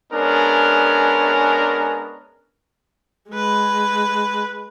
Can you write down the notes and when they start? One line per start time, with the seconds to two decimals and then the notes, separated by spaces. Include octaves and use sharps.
0.12 G#3 B3 C#4 D4 A#4
3.30 G#3 B4